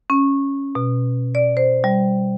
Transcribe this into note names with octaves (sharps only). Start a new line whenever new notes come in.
C#4
B2
D5
C5
G3